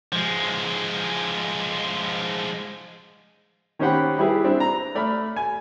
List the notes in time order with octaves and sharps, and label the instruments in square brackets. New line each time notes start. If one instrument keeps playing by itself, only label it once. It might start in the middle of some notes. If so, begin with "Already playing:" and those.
[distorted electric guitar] F3 G#3
[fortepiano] D#3 C#4 G4 C5 F#5 B5
G3 E4 G4 G#4 B4
G3 C4 D4
A#5
A3 D5 B5 F6
G#5